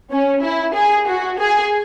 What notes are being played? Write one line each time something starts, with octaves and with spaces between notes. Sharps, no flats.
C#4
E4
G#4
F#4
G#4